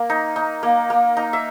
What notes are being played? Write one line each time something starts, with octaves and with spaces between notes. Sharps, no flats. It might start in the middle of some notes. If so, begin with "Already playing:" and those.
Already playing: A#3
D#4
D#4
A#3
A#3
D#4
E5